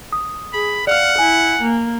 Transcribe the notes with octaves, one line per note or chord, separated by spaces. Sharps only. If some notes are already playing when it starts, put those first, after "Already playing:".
D#6
G#4 B5
D5 F5 F#5 F6
E4 G#5
A#3